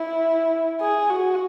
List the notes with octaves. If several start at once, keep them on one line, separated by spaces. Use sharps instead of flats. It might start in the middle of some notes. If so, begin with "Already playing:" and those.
Already playing: E4
G#4
F#4